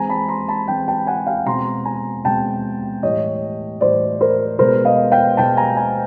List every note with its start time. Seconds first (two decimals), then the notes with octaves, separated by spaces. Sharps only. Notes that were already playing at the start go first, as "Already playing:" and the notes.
Already playing: E3 G#3 C4 G#5 A#5
0.09 A5 B5
0.28 A#5 C6
0.48 A5 B5
0.68 E3 G#3 C4 G5 A5
0.88 G5 A5
1.07 F#5 G#5
1.27 F5 G5
1.46 B2 G#3 C4 A#5 C6
1.85 G#5 A#5
2.25 B2 G#3 C4 G5 A5
3.03 A2 E3 G3 C#5 D#5
3.81 A2 E3 G3 C5 D5
4.21 A#4 C5
4.59 B2 G#3 B3 A#4 C5
4.85 D#5 F5
5.12 F5 G5
5.37 B2 G#3 B3 G5 A5
5.57 G#5 A#5
5.77 G#5 A#5